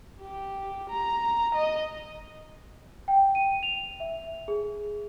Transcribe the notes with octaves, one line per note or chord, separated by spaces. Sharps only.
G4
A#5
D#5
G5
D#7
F7
E5
G#4